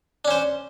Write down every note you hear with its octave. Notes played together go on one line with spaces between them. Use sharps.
C#4 D4 C5